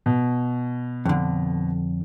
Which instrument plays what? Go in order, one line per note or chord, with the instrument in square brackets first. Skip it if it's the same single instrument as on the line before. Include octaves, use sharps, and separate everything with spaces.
[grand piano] B2
[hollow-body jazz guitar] F2 D3